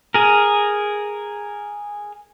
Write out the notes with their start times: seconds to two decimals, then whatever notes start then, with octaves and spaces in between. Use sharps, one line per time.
0.14 G#4 A#4